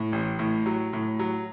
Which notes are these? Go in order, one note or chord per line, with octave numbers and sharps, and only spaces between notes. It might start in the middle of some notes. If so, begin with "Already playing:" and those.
Already playing: A2
A1
A2
F#3
A2
F#3